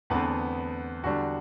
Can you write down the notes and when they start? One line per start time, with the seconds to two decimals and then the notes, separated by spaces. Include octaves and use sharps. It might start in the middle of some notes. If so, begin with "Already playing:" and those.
0.10 E2 D3 A3 B3 C4 B4
1.04 E2 D3 G3 F#4